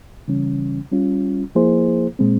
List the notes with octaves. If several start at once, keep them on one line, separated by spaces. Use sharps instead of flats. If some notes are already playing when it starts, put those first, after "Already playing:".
C#3 E3 G3 C#4
G3 C#4 F4
F3 A#3 E4 G#4 C5
A#2 G#3 C4